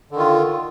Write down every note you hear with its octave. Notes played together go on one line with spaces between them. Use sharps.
D3 D#3 F4